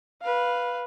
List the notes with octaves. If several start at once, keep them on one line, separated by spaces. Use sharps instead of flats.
B4 F5